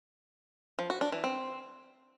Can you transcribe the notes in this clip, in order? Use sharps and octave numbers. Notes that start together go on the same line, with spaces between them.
F3
F#4
D4
E3
C4